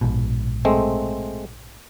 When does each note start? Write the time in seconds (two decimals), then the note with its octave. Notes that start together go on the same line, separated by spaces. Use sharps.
0.01 A#1 G#2 B2
0.65 G#3 A3 C4